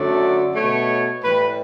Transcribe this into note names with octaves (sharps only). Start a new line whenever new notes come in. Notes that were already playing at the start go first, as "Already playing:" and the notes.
Already playing: F#2 D3 F#3 A3 D5
B2 A3 C#5
A2 E3 G3 B4